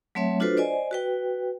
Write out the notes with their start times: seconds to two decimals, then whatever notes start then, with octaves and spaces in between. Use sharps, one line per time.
0.15 F#3 A3 C4 C#5 E5
0.40 D4 F4 F#4 A4 B4 C5
0.57 C5 D5 D#5 G#5
0.91 F#4 B4 G5